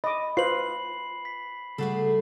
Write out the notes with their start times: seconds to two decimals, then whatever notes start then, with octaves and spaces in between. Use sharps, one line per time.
0.04 D#5 B5 D6
0.37 F4 B4 C5 C7 F#7
1.25 B6
1.78 C#3 G3 A3 F#4 G#4 A4